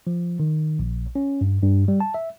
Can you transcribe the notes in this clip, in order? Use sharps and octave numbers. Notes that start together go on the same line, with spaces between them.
F3
D#3
A#1
C#4
G2
G2
G3
A5
E5